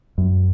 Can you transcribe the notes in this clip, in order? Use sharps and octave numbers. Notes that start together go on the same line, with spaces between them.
F#2